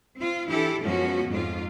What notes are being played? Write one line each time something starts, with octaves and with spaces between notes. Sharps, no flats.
C4 F4
E3 D4 E4 G4 A4
F#2 F3 G#3 B3 C#4 F#4
F2 G#2 F4